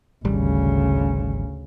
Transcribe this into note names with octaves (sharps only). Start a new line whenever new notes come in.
G#1 D2 C#3 G3